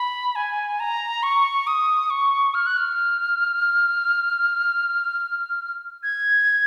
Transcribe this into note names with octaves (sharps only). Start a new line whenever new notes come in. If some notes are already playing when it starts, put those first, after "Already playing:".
Already playing: B5
G#5
A#5
C#6
D#6
C#6
F6
F#6
F6
G#6